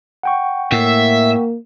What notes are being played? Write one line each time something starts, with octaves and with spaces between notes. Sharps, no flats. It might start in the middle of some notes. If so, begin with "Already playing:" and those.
F#5 G5 C#6
A2 A#3 E5